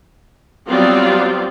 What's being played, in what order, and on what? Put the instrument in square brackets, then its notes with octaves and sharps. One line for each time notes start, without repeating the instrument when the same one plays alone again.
[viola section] F#3 G3 B3 C4 F4 D5